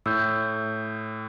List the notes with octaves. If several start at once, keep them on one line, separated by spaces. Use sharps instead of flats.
A2 E6 G6